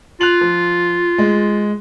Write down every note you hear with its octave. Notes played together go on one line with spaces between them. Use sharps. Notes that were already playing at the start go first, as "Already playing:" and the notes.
F4 F#6 F7 F#7
F3
G#3